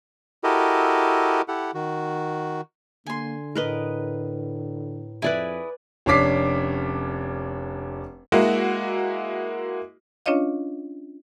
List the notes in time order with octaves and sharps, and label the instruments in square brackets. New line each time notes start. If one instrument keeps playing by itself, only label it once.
[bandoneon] E4 F#4 G4 A4 A#4 D#5
E4 G4 A4 F#5
D#3 F#4
[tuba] D3 [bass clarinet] A#3 [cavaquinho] G#5 C6
[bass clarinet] A2 [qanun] A#4 B4 D#5
[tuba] F2 [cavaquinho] E4 G#4 [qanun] B4 D5 G#5
[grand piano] F1 C#4 D4 D6 B6 C7
[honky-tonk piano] G#3 A#3 E4 F#4
[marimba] C#4 D4 F4 C#5 D#5 F5